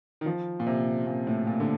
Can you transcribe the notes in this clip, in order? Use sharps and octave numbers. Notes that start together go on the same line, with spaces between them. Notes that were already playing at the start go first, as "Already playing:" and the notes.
D#3
F3
A#2
C3
A#2
A2
A#2
D3